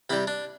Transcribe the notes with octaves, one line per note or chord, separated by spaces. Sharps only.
C3 G3 E4
D4